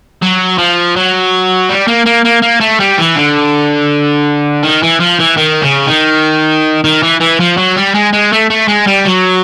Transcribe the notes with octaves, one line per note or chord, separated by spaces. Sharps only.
F#3
F3
F#3
G3
A#3
A#3
A#3
A#3
A3
G3
E3
D3
D#3
E3
F3
E3
D#3
C#3
D#3
D#3
E3
E3
F3
F#3
G3
G#3
G#3
A3
A3
G#3
G3
F#3